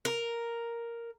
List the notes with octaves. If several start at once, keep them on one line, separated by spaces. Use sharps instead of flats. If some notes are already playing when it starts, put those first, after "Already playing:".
A#4